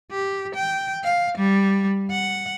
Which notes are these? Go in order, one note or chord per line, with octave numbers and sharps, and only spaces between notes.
G4
G5
F5
G3
F#5